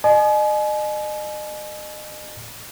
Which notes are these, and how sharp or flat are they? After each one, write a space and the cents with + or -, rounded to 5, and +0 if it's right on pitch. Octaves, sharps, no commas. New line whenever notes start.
D#5 -35 G#5 +35